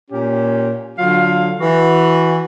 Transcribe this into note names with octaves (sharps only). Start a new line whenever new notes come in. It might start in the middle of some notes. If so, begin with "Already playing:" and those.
A#2 C#4 G4
D3 F#3 F4 F5
E3 F#4